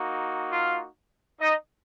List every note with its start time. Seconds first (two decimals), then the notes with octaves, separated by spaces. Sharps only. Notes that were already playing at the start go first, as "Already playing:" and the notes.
Already playing: A#3 D#4 F#4
0.52 F4 F5
1.41 D#4 D#5